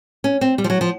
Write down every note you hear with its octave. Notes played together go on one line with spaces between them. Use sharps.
C#4
C4
G3
F3
F#3
F3